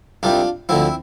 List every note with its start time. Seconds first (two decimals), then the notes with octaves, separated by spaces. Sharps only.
0.23 C2 C3 G3 D4 F4
0.69 D2 D3 F3 C4 E4